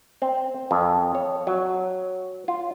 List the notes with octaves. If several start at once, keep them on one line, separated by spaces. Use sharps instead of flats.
C4
F2
C#5
F#3
F4